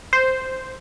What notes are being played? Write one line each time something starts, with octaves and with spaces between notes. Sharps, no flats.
C5